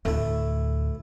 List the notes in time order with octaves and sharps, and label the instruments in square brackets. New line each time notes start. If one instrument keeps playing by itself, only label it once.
[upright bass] D2 A2 [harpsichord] A3 E4